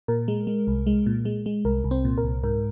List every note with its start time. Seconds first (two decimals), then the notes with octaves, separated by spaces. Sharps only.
0.08 A#2 A#4
0.28 G#3
0.47 G#3
0.67 C2
0.87 G#3
1.06 A#2
1.25 G#3
1.46 G#3
1.65 C2 A#4
1.84 C2
1.91 C4 C5
2.05 A#2
2.18 A#4
2.24 C2
2.44 G#2 A#4